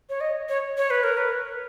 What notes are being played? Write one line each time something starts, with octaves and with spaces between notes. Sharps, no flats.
C#5
D#5
C#5
C#5
B4
A#4
B4